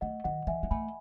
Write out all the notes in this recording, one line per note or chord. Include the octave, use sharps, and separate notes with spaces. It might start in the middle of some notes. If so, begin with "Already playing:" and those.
A3 D#5 F#5
D#3 D#5 F#5
E3 E5 G#5
G#3
A3 G#5 B5